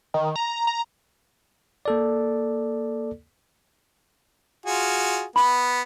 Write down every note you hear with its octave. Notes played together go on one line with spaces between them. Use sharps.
D#3
A#5
A#5
A#3 A4 D5
F4 F#4 G#4
B3 B5